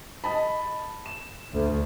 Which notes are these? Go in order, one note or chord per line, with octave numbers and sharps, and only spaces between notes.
D#5 A5 B5
E7
D2